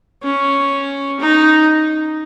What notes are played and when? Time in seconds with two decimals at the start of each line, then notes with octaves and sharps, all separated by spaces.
0.23 C#4
1.20 D#4